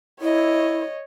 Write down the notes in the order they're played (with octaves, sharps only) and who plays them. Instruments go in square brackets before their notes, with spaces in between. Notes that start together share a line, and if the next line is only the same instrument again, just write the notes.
[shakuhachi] E4 [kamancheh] C#5 D#5